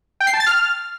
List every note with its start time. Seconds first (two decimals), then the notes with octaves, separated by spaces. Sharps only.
0.20 G5
0.27 C7
0.33 A5
0.40 A6
0.46 F6